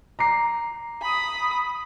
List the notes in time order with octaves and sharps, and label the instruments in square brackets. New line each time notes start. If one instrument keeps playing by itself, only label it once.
[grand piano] A#5 D6 C7
[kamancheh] B5 D#6